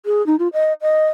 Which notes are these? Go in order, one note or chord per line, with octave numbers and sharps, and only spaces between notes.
G#4
D#4
F4
D#5
D#5